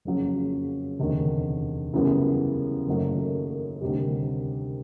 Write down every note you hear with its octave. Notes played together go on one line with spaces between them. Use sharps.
F#1 F2 C#3 F#3
E1 D2 C3 D#3
F#2 C#3 E3 G3 B3
F#1 F#2 D#3 F#3 A3
D2 C3 D#3 G3